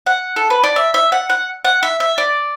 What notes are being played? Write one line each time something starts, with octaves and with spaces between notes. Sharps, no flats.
F#5
A4
B4
D5
E5
E5
F#5
F#5
F#5
E5
E5
D5